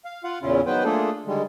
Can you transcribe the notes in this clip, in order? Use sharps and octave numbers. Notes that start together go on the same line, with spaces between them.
F5
F4 F5 F#5
E2 A#2 C#3 C#4 E4 F4
D#3 F#3 B3 B4 C5 G5
A3 A#3 D4 F4 G#4 A4
D3 D#3 G3 G#3